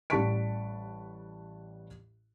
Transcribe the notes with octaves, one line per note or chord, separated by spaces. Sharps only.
A1 G3 A5 C#6 B6 D7